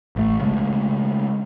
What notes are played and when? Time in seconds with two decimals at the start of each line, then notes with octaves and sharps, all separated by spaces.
0.16 A1 A3
0.41 C#3 G#3 A3